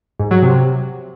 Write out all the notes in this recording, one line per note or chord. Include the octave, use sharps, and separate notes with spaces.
G#2
F#3
C3